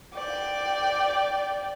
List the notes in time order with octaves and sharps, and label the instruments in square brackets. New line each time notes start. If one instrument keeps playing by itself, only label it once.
[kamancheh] D5 G5